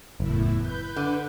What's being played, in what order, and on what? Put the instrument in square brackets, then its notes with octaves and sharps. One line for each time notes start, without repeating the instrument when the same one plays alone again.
[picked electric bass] F#1 [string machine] E2 A2 E4
[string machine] B4 G6
[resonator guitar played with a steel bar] D3